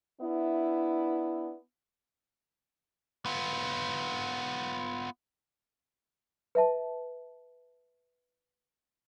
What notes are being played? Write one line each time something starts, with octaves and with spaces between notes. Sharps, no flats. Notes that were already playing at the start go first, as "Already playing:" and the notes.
B3 D4 E4
B3 F4
B4 E5 A5